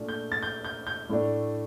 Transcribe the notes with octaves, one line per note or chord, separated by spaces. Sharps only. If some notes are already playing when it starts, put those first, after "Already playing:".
Already playing: A#2 A3 D4
G6
A6
G6
G6
G6
A2 A3 D4